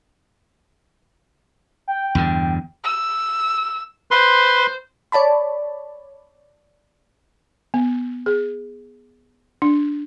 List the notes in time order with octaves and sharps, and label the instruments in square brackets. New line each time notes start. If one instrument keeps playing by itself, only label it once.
[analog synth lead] G5
[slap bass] E2 G2 D3
[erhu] E6
[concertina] B4 C6 [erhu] C5
[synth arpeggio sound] C#5 D5 A5 B5
[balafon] B3
G#4
D4